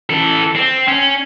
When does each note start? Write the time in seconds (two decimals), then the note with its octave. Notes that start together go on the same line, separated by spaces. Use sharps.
0.10 E3 A4
0.55 C4
0.88 C#4